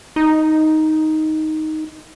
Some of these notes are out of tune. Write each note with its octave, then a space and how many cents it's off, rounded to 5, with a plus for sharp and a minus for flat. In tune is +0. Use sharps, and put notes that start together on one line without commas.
D#4 +5